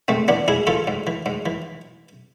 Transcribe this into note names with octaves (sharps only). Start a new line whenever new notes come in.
G#2 A3 C4
E3 B3 D4
G#2 E4 G#4
E3 F4 A4
G#2
E3
G#2
E3